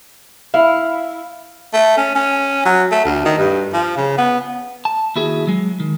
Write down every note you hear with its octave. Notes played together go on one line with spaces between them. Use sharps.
E4 F5
A3
C#4
C#4
F#3
A3
D2
D#3
G2
F3
C#3
B3
A5
D#2 E4 F#4 G#4
F#3 G#3
D#3